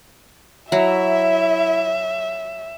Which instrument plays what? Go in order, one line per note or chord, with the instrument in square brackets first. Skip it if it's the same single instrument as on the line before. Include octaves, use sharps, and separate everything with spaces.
[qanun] F#3 [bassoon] E4 [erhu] E5